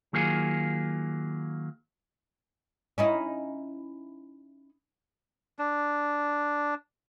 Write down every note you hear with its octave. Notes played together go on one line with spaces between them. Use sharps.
D#3 F#3 A#3 F4 G#4
C#4 D#4 E4
D4